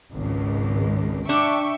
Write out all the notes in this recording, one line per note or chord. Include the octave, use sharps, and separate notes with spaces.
G#1 C#2
D4 E5 G5 C#6